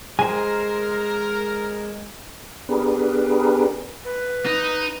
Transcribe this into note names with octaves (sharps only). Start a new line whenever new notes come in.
G#3 A#4 C5 G#5
B3 D4 G4 G#4 A#4 B4
B4
D#4